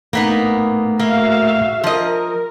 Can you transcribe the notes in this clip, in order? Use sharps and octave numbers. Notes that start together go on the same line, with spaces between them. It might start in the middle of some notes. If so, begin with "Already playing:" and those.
A2 A#3 B3 D#4
A#3 F#4 E5 F5
F3 A#4 D#5